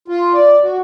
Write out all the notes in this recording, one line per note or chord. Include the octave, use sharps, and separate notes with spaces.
F4
D5
F#4